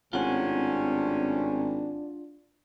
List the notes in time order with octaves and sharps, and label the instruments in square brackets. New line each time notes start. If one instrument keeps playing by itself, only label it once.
[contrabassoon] G#1 [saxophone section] A2 C3 C#4 [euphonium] D4 [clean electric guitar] F4 F#5